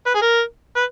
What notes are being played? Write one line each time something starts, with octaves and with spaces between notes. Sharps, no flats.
B4
G#4
A#4
B4